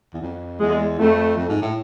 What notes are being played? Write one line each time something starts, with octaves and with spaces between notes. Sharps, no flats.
E2
F2
E2 G#3
F2 A3
F2
G#2
A2